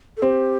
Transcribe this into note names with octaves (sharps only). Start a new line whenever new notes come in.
A4
C4 G4